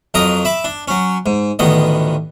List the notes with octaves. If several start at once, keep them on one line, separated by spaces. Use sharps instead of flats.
F2 F#3 A#4 D#5 A#5 D#6
E5 B5 D6
D4
F#3 C#4
G#2
A1 D2 D#3 B3 D#5